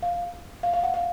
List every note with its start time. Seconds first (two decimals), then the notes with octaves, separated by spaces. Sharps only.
0.03 F5
0.63 F5
0.74 F5
0.84 F#5
0.94 F5